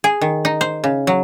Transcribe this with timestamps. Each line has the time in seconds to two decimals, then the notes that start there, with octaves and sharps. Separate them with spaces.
0.04 G#4
0.21 D#3
0.45 D#4
0.61 C5
0.84 C#3
1.07 F#3